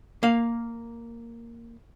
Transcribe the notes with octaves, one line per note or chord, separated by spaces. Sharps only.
A#3 F5